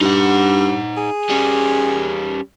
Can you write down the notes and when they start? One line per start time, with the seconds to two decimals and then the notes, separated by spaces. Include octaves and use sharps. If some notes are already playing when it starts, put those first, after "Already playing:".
0.01 G2 D#4 F#5
0.97 G#4
1.30 G3 C#4